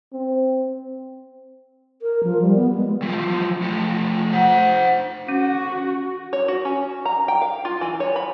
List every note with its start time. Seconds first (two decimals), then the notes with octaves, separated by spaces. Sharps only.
0.13 C4
2.02 A#4
2.23 F3
2.42 G3
2.56 B3
2.75 G#3
3.02 E3 F3
3.62 F3 A3
4.33 C5 F#5
5.28 C#4 F#4
6.33 C#5
6.48 F#4
6.65 C#4
7.05 A#5
7.28 G5
7.42 F5
7.65 F4
7.81 E3
8.00 C#5
8.16 B5